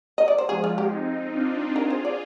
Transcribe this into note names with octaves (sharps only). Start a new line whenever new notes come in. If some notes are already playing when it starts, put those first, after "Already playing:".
D#5
D5
C5
F3 G#3 G#4
F4
G4
C4 D#4
D4 F4
F4 G#4 A#4
C5
D5